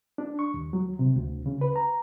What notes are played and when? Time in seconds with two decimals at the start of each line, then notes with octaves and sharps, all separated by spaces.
0.18 D4
0.39 C#6
0.54 D#2
0.73 F#3
0.99 C3
1.16 D2
1.46 C#3
1.61 B4
1.76 A#5